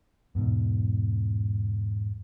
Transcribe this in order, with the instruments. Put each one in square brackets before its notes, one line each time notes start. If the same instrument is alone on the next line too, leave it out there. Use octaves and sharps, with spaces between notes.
[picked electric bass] E2 G#2 B2